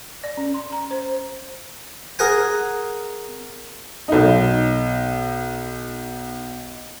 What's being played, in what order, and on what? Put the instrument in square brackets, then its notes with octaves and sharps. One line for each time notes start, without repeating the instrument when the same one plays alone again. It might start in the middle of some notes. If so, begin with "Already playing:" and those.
[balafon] D5
C#4
C6
A#5
C5
[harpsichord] G#4 A#4 F#5 G#5
[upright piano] B1 D#4